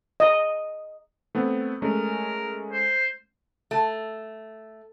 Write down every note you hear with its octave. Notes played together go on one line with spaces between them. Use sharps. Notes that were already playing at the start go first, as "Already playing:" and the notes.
D#5
A3 B3 C4
G#3 A3 C#4 A#4
C5
A3